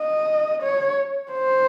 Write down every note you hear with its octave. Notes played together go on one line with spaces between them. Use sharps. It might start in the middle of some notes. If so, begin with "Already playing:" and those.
Already playing: D#5
C#5
C5